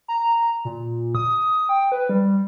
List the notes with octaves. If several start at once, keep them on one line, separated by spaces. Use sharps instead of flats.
A#5
A#2
D#6
G5
B4
G3